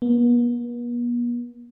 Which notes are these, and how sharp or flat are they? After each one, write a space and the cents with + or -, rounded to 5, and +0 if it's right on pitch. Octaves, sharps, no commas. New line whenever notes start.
B3 -45